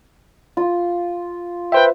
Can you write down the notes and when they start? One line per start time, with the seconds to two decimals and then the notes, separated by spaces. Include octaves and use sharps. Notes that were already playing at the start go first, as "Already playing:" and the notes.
0.57 F4
1.72 B4 C5 E5 G5